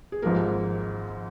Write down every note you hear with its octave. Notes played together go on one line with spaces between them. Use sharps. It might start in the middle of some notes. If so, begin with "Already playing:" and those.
G#4
G#1 G#2 F3 A#3 A#4